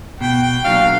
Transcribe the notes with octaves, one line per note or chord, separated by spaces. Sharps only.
B2 G5
G5
F#3 A#3 D4 F#4 F5